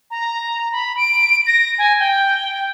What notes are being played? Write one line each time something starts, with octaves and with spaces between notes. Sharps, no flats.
A#5
B5
D7
A#6
G#5
G5